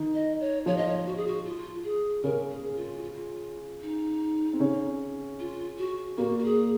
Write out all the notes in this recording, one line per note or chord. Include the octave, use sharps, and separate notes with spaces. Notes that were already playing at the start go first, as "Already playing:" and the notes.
Already playing: D#3 D#4
D#5
C#5
F3 F4 C#5
D#5
C#5
F#4
G#4
F#4
F4
G#4
C#3 C#4 A#4
G#4
F4
F#4
F4
D#4
C4
C#3 C#4
F4
F#4
A#2 A#3 F#4
F#4
G#4